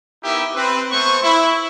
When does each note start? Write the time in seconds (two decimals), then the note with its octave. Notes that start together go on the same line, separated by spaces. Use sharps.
0.24 B3 D#4 E4 G4 A#4 E5
0.56 C4 B4
0.91 A3 B3 C5 C#6
1.23 E4